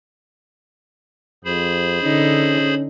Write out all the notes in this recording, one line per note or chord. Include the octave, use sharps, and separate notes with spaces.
F2 G#4 C5 B5
D3 C#4 D#4